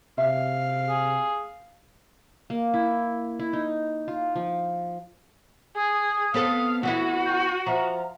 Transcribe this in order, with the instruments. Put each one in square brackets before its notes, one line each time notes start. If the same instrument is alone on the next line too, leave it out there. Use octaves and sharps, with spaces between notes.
[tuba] C3 [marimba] E5 [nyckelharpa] F5
[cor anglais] G#4
[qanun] A#3
E4
E4
D#4
F4
F3
[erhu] G#4 [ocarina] D#6
[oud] B3 C4 A4 [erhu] F5
[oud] E3 B3 E4 [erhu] F#4 [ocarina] F#5
[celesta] G5 C#6 G6
[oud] F3 [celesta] C5 E5 F#5 [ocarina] A#5